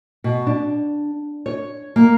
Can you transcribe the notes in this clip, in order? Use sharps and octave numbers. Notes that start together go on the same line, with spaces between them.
B2
D4
C#5
A#3